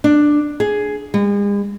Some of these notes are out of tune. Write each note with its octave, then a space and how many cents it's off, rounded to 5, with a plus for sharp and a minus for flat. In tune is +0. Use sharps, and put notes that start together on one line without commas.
D4 +10
G#4 +10
G#3 -45